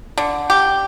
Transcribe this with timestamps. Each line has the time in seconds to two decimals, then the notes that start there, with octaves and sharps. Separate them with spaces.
0.18 D3
0.50 G4